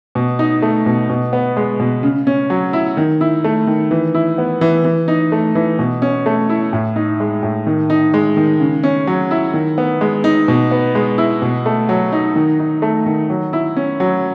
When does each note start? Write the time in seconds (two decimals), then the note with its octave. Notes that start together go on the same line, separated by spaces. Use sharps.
0.15 B2
0.39 D#4
0.62 A3
0.86 B2
1.09 B2
1.33 B3
1.57 G#3
1.80 B2
2.03 C#3
2.27 C#4
2.50 F#3
2.73 E4
2.97 D#3
3.21 E4
3.44 A3
3.67 D#3
3.91 E3
4.14 E4
4.38 B3
4.61 E3
4.84 E3
5.08 D#4
5.32 A3
5.55 E3
5.79 B2
6.02 C#4
6.26 A3
6.49 E4
6.73 A2
6.96 D#4
7.20 G#3
7.43 A2
7.67 D#3
7.90 D#4
8.14 G#3
8.37 D#3
8.60 C#3
8.83 C#4
9.07 F#3
9.31 E4
9.54 D#3
9.78 B3
10.01 G#3
10.24 D#4
10.48 B2
10.71 B3
10.95 G#3
11.18 E4
11.42 B2
11.66 A3
11.89 F#3
12.12 D#4
12.36 D#3
12.59 D#4
12.82 A3
13.06 D#3
13.30 F#3
13.53 E4
13.76 C#4
14.00 F#3